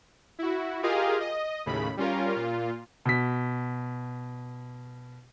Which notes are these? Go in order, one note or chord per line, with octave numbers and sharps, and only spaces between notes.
E4 F#4
F4 G4 G#4 A#4 D#5 F5
D#5
D#2 A2 C#3 B5
G3 C#4 F4 A#4
A#2 F4
B2 B6